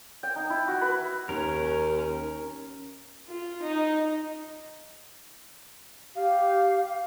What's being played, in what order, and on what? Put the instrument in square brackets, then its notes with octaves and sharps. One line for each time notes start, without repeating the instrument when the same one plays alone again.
[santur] G5
D#4
E4
F#4
B4
[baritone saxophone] D#2 [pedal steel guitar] C#4 A#4
[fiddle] F4
D#4
[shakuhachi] G4 [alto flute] F5